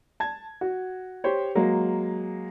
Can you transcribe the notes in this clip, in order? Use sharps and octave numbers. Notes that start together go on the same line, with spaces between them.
A5 G#6
F#4
G4 C5 C#5
F#3 G#3 A#3